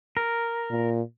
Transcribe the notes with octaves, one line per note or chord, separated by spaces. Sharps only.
A#4
A#2